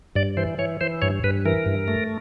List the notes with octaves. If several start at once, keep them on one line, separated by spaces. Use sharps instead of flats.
G2 D5
E3 C5
E3 C#5
E3 C5
G2 C#5
G2 B4
E3 A#4
G2
A3